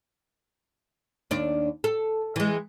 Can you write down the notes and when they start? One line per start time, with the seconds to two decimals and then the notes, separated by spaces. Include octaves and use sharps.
1.31 D#2 D4
1.84 A4
2.36 E3 G#3